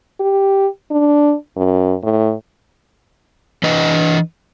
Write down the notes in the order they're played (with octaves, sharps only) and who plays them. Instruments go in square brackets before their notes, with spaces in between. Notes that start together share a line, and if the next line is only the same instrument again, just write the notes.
[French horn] G4
D4
F#2
A2
[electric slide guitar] E3 D4 B4 D#5